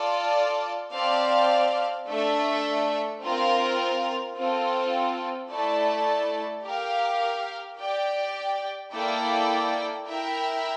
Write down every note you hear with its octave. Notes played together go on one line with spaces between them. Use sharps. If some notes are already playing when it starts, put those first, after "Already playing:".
Already playing: F4 A4 D5 A5
C4 G4 D5 F5 A5
A3 D4 A4 E5
C4 F4 A#4
C4 F4 A4
A3 E4 A4 D5 A5
G4 A#4 F5
G4 D5 G5
A#3 E4 A4 D5 G5
E4 A#4 E5 G5